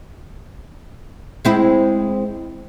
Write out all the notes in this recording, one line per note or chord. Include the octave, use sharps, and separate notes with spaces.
G#3 C4 E4